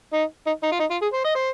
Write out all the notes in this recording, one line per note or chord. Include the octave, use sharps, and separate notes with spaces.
D#4
D#4
D#4
F4
D#4
F4
G#4
C5
D#5
C5